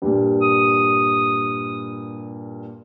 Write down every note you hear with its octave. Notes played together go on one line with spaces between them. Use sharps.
G2 A#2
D#6